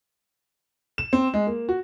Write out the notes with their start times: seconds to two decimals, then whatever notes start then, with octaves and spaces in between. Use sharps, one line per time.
0.98 E7
1.13 C4
1.34 G#3
1.47 A#3
1.69 F#4